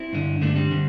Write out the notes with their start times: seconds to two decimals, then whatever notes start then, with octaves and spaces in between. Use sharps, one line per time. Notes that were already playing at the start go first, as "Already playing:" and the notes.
Already playing: C4 E4
0.13 G2 D3
0.41 G2 D3 A3 D4
0.56 G3 C4
0.71 D3